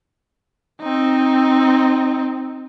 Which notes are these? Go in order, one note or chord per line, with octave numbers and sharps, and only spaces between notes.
C4 D#4